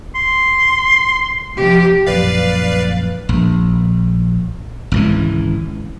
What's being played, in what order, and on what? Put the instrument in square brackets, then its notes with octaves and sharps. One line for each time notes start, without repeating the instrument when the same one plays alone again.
[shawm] C6
[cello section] C3 F3 G4
[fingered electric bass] A#1 F#2 [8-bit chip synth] B4 D5 F5
[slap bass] A#1
G#1 C#2 E3